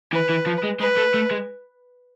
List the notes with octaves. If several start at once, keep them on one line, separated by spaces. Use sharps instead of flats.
E3 B4
E3
F3
G#3
G#3 B4
A3
A3
G#3